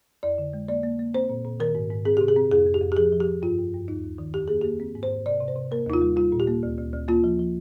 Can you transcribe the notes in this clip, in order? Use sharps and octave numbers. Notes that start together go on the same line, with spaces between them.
F2 D5
D3
G#3
A#3 D5
A#3
A#3
C4 C5
A#2
A#2
D#3 A#4
G#2
G#2
C4 G#4
C3 G4
G#4
C4
F2 G#4
F2
G4
F2
G4
F3 G#4
F3
G4
F3
G2 F4
G2
G2
D#2 D#4
D#2
D#3
F2 G4
A#3 G#4
G4
A#3
C4
G#2
C5
G#2
C3 D5
C3
C5
C3
A#3 A#4
D#2 D#4
F4
G3
G3 F4
A#2
G4
A#3
D2
D2
D2
A#3 F4
F3
F3